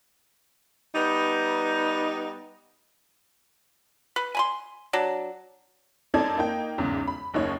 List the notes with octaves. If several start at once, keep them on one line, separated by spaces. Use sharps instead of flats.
G3 B3 D#4
B4
G#5 B5 C6
F#3 D4
F#2 C4 D#4 A4 D5 G#6
A#3 D#4 G5
B1 E2 G#2 C#3
B5
F#1 D#2 D#4 C#5